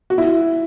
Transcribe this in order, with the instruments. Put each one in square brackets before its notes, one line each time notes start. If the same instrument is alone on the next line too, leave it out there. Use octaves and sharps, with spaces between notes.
[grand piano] F#4
E4